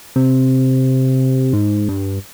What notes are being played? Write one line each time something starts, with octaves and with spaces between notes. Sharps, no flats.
C3
G#2
G2